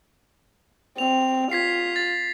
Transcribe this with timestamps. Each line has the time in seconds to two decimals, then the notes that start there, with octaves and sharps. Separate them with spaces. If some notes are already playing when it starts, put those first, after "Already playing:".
0.98 C4 F7
1.52 F4 G#6 B6 C7
1.96 A6